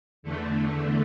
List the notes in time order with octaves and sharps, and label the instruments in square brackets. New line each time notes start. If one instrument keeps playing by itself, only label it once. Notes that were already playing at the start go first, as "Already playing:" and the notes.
[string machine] E2 D3 A3